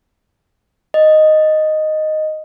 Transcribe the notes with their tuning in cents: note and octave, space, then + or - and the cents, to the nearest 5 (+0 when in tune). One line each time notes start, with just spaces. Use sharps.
D#5 -5